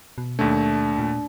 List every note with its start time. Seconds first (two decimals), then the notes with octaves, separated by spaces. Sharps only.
0.18 B2
0.39 D#2 A3 D4
0.99 A#2